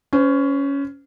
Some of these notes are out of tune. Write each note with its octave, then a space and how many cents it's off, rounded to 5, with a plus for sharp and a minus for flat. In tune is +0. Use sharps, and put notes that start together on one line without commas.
C#4 +10 C5 -35